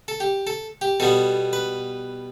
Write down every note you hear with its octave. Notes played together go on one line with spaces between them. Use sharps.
A4
G4
A4
G4
B2 G3 B3 A4
B4